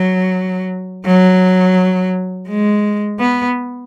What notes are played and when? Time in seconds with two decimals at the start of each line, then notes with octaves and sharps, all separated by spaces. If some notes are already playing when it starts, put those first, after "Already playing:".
Already playing: F#3
1.06 F#3
2.49 G#3
3.20 B3